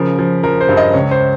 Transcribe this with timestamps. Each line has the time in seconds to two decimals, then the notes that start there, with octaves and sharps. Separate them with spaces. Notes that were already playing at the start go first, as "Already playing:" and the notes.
Already playing: C#3 F3 A#4
0.19 F3
0.43 F3 A#4
0.61 C5
0.69 G2
0.77 D#5
0.94 C#2 C#5
1.11 C5